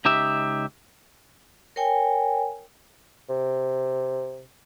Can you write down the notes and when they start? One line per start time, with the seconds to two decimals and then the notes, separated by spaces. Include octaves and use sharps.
0.05 C#2 D#4 G4 E5
1.76 A#4 C#5 G5 G#5
3.29 C3